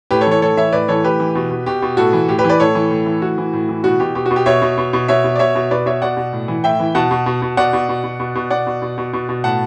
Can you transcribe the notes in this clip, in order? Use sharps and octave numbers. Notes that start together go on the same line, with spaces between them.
A2 G4 B4
A4 C#5
E3
A4 C#5
A2 A4 C#5
E3 C#5 E5
A2 B4 D5
E3 A4 C#5
A2 G4 B4
E3
B2
B2
B2 G4
B2
A2 F#4 A4
E3
A2 G4
G4 B4
E3
B4 D5
A2 A4 C#5
E3
A2
E3
A2 F#4
E3
A2
E3
B2 F#4
B2 G4
B2 G4
B2 F#4
G4
B2 C#5 E5
B2
B2
B2
B2 C#5 E5
B2
D5
B2 C#5 E5
B2
B2 B4 D5
B2 C#5 E5
B2 D5 F#5
B2
A2
E3
A2 E5 G5
E3
B2 F#5 A5
B2
B2
B2
B2 D5 F#5
B2
B2
B2
B2
B2
B2 D5 F#5
B2
B2
B2
B2
B2
A2 F#5 A5